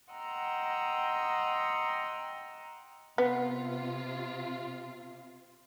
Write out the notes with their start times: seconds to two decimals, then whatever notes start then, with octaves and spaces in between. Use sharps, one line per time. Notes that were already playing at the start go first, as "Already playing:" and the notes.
0.12 D#5 F#5 G5 A#5 C6 E6
3.18 C3 B3 F4